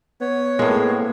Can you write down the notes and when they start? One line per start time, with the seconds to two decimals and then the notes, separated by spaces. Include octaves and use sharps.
0.21 B3 C#5
0.59 A2 G#3 A#3 C4 G#4